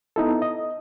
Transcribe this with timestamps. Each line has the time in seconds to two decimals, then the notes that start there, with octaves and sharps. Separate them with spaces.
0.16 B3 D#4 E4 A4
0.42 D#5